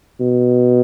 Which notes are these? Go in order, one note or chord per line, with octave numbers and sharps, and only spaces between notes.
B2